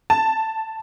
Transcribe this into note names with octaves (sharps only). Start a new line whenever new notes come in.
A5